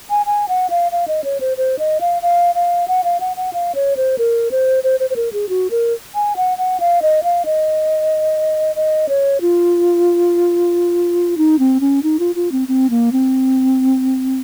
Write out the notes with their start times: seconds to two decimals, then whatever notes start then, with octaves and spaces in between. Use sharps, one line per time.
0.10 G#5
0.26 G#5
0.49 F#5
0.70 F5
0.92 F5
1.08 D#5
1.24 C#5
1.40 C5
1.57 C5
1.79 D#5
2.01 F5
2.22 F5
2.55 F5
2.88 F#5
3.04 F5
3.20 F#5
3.37 F#5
3.53 F5
3.75 C#5
3.97 C5
4.18 A#4
4.51 C5
4.84 C5
5.00 C5
5.10 C5
5.16 A#4
5.33 G#4
5.49 F#4
5.71 A#4
6.15 G#5
6.36 F#5
6.58 F#5
6.80 F5
7.02 D#5
7.23 F5
7.45 D#5
8.76 D#5
9.09 C#5
9.41 F4
11.38 D#4
11.59 C4
11.81 C#4
12.03 D#4
12.19 F4
12.36 F4
12.52 C4
12.68 C4
12.90 A#3
13.12 C4